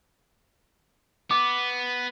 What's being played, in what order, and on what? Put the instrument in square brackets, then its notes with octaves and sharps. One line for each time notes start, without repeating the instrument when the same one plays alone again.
[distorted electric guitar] B3 [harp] D6